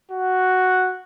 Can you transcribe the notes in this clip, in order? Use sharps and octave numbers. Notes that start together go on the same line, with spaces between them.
F#4